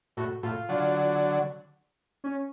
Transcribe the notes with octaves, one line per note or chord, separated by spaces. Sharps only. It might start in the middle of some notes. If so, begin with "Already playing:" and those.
A2 F#4
A2 F4
D3 F#3
C#4